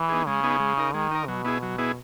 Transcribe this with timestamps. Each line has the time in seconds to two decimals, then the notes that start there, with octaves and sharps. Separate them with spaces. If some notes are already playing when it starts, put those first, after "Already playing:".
Already playing: E3
0.09 B3 D#4 G#4
0.27 C#3 G#3
0.43 B3 D#4 G#4
0.60 G#3
0.78 D#4 A#4
0.94 D#3 G#3
1.11 D#4 A#4
1.28 B2 F#3
1.45 B3 E4 G#4
1.63 F#3
1.78 B3 E4 G#4